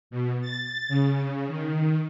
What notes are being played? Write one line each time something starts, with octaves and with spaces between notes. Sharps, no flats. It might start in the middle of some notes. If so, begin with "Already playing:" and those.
B2
A6
C#3
D#3